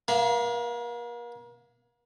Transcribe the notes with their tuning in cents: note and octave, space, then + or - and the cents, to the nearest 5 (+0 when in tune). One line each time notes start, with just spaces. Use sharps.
A#3 +40 F5 -30